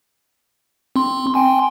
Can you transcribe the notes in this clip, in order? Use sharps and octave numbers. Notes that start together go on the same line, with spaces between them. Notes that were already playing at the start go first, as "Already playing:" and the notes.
C4 C6
G5 G#5 C6